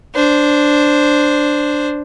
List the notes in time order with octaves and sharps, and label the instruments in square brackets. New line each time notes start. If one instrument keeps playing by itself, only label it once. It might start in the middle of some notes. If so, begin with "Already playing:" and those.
[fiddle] D4 C5